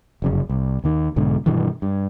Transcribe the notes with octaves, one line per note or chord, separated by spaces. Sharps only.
F1 F#2 C#3
C2
D#2 D#3
B1 G#2 B2 D3
G2 B2 D#3 E3
G2